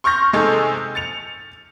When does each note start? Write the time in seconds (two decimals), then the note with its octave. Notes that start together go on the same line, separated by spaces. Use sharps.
0.04 C6 C#6 F6 G6 A#6
0.33 C3 G#3 D#4 G#4 A4
0.95 A6 C#7 F7